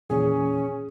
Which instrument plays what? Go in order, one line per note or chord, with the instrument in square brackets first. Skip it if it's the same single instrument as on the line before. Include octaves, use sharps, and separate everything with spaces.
[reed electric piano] E2 A#2 E3 [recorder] C#4 [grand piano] G#4